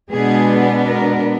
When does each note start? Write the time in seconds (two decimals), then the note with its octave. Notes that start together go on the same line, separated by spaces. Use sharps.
0.11 B2 G#3 B3 D4 G#4
0.89 A#4